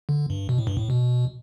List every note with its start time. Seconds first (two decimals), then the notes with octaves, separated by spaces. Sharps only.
0.09 D3
0.30 G2
0.49 B2
0.58 A2
0.67 G2
0.77 A2
0.90 B2